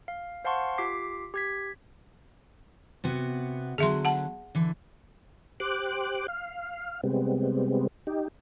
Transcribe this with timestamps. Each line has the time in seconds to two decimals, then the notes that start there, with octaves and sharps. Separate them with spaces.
0.08 F5
0.45 C5 F5 F#5 A5 C6 C#6
0.78 F4 G4 D6 B6 C7
1.34 G4 G#6 B6
3.04 C3 B3 F#4
3.78 D3 F#3 G#4 E5 C6
4.05 F#5 A5
4.55 D3 E3
5.60 G4 C5 D6 F#6
6.28 F5
7.03 C3 G3 G#3 B3 C4
8.07 D#4 G4